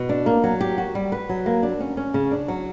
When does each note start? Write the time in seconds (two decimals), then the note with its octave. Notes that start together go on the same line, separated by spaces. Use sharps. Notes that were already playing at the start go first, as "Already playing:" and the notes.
Already playing: B2
0.09 D4
0.26 A#3
0.44 F#3
0.61 G4
0.78 F#4
0.95 G3
1.12 B4
1.29 F#3
1.46 A#3
1.63 D4
1.80 C#4
1.97 C#4
2.14 C#3
2.31 D4
2.48 F#3